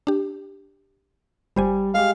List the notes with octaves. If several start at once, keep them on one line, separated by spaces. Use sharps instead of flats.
D4 G4
G1 G3 C5 G#5
G#3 G4 F5